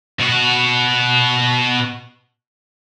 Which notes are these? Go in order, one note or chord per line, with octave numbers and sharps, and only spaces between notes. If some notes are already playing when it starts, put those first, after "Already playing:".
B2 F#4